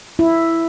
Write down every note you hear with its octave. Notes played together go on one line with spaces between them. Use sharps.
E4